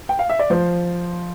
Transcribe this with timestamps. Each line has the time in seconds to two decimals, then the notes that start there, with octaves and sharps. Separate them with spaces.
0.09 G5
0.19 F5
0.30 E5
0.39 D5
0.50 F3 C5